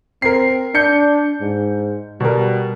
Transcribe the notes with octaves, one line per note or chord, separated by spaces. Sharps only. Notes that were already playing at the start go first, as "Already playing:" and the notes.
C4 A#4 C7
D4 G6 C#7
G#2
B2 G3 A#4